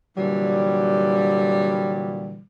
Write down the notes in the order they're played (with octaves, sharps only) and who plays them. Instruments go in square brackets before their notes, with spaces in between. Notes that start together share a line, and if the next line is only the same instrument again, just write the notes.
[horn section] A#2 D3 E3 F#3 G3